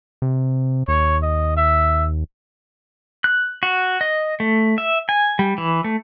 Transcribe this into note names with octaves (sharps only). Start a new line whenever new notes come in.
C3
D#2 C#5
D#5
E5
F#6
F#4
D#5
A3
E5
G#5
G3
E3
A3